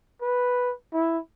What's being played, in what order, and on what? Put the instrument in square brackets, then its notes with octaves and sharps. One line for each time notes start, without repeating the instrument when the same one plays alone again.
[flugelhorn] B4
E4